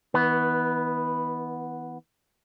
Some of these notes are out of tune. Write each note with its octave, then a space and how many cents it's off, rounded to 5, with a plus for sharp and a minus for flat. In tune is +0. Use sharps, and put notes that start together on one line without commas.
E3 -35 B3 +0